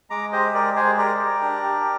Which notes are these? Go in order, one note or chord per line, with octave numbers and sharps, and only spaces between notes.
G#3 A#5 D6
G4 C5 D#5
G#3 A#4 D5
G#3 G#4 C5
G4 A#4 D5
G4
D4
G4